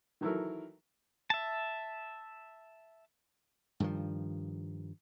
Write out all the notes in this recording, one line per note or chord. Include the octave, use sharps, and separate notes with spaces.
D#3 E3 F#3 E4 A4 A#4
E5 A5
G2 D#3 F3